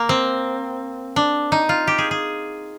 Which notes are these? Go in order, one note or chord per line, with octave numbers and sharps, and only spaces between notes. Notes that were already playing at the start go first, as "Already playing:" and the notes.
Already playing: A#3
C4
D4
D#4
F4
G4
G#4
G#4